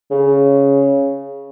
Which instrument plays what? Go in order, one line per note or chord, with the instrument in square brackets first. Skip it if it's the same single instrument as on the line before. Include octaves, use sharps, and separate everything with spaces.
[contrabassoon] C#3